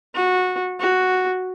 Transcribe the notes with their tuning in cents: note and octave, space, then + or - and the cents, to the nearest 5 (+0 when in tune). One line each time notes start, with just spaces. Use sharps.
F#4 -15
F#4 +0